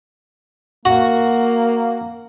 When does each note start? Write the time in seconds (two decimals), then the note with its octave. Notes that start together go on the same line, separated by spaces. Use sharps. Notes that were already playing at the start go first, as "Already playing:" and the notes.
0.85 A#3 F#4